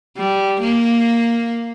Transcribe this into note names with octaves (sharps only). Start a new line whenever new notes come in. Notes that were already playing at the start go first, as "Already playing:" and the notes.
G3
A#3